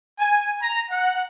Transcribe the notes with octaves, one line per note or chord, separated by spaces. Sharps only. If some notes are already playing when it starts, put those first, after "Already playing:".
G#5
A#5
F#5